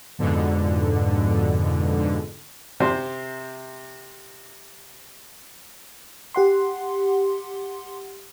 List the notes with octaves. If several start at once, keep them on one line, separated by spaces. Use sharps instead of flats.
F2 G#2 B2 D3
C3 C5
G4 F#5 C6